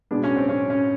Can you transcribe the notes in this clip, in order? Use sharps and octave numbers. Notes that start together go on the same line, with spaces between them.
B2 G#3 B3 D4
C#4
C4
C#4
C#4